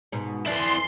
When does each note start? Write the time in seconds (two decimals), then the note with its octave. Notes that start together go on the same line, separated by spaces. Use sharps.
0.12 G#2 B2
0.46 F2 E3 E4 D5 C6